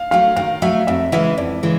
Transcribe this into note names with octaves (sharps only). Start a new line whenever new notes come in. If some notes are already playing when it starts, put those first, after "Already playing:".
Already playing: F5
F#3 A3 F5
D#3 F5
F#3 A3 E5
F2 E5
C#3 E3 G#3 E5
F2 D5
C#3 E3 G#3